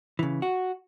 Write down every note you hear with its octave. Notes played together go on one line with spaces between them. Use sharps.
C#3 E3
F#4